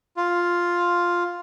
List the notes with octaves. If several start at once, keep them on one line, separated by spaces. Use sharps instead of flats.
F4